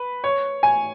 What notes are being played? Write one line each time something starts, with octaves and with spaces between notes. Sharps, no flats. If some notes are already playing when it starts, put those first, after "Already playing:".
Already playing: B4
C#5
G#5